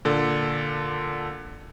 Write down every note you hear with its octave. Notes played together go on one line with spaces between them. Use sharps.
A#2 D3 A4